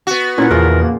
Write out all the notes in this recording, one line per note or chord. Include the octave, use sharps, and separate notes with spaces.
B3 F#4
A#2 C#4 E4 F#5
E2 C#3 F3 A#4
A#3